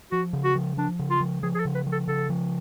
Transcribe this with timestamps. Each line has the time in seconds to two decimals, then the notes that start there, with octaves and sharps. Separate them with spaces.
0.12 F3 F#4
0.33 C#3
0.44 F#4
0.55 F3
0.77 F3 D4
0.99 C#3
1.10 F4
1.20 F3
1.42 F3 G#4
1.55 G#4
1.59 A4
1.65 C#3
1.75 B4
1.86 F3
1.92 A4
2.07 C#3 A4
2.29 F3